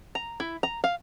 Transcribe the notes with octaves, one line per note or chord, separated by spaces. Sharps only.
A#5
E4
A#5
F5